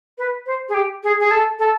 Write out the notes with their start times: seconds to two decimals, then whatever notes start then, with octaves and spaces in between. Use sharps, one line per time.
0.18 B4
0.46 C5
0.69 G#4
0.74 G4
1.03 G#4
1.20 G#4
1.31 A4
1.59 A4